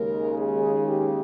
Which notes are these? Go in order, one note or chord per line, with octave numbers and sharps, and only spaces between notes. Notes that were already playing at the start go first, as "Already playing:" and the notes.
Already playing: D#2 C#3 G#3 A#4
G#4
G4